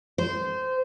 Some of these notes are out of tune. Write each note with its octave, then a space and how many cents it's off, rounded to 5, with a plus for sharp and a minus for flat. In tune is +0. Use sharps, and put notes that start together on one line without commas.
C5 -20